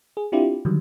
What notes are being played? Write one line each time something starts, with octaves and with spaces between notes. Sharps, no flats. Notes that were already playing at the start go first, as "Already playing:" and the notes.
G#4
C4 D4 E4 F4 G4
D3 D#3 F#3 G3